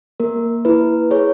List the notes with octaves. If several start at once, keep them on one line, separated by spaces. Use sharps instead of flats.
A#3 A#4
E4 B4
G#4 C#5